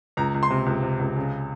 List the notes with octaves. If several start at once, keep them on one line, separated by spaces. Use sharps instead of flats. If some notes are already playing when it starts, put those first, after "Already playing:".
C#2 A#5
C#2
C6
C3
C#2
C3
C#2
C#3